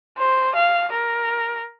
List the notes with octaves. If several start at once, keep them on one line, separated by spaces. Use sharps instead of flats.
C5
F5
A#4